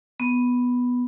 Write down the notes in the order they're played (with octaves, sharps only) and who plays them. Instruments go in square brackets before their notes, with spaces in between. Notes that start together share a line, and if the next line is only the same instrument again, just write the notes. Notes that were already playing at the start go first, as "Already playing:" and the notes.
[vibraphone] B3